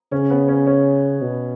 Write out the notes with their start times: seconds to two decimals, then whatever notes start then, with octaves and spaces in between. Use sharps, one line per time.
0.12 C#3 C#4
0.30 B3
0.48 C#4
0.67 C#4
1.22 B2